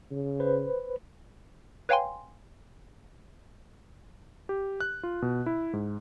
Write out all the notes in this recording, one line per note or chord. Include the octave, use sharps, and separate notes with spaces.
C#3
B4 C5
B4 C#5 F5 G5 G#5 C6
G4
F#6
F4
B2
E4
G#2